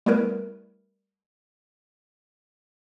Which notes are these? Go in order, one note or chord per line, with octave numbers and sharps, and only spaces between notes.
G3 A3 B3 E4 A#4 B4